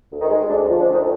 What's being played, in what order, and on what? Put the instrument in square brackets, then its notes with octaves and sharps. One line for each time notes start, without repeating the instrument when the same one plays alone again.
[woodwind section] D2
D#3 D#4
G#3
D2 D4
C#4
F3
D4
D2 D#3 D#4